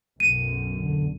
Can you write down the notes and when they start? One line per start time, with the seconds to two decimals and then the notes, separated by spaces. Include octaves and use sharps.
0.20 B1 F#2 D#7
0.75 E2 D3